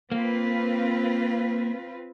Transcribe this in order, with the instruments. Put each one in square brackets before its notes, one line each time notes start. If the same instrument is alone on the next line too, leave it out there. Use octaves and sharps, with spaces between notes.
[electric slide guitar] A#3 [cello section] C4 F4 B4